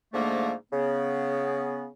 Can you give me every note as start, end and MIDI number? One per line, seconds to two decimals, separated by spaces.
0.13 0.53 44
0.13 0.53 50
0.13 0.53 53
0.13 0.53 57
0.13 0.53 58
0.72 1.88 49
0.72 1.88 59